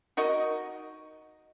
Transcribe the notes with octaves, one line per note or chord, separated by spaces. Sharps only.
D#4 F#4 A#4 D#5